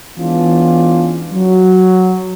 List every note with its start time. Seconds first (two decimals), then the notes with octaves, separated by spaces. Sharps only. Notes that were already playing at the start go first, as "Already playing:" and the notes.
0.18 E3 G#3 B3 C#4 D4 F4
1.32 F#3